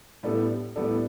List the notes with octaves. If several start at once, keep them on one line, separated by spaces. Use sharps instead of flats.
A2 G3 B3 D4 A4
A2 G3 B3 D4 A4